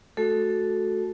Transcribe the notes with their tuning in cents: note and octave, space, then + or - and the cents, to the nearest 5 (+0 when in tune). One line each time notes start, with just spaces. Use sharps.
A3 -20 F#4 +0 A4 +0